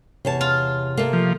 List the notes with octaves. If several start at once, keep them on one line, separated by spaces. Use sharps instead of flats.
E2 C3 C#5 A5
F4
A3 A#3
F3